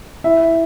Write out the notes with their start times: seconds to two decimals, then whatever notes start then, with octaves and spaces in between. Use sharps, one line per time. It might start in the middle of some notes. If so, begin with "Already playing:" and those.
0.24 E4 E5